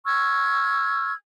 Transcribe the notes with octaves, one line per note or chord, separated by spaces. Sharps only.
C#6 E6 F6 G#6